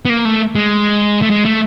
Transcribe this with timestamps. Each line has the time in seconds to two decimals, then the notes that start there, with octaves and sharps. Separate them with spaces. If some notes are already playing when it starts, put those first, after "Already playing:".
0.05 B3
0.10 A#3
0.25 A3
0.55 G#3
1.22 A3
1.30 G#3
1.45 A3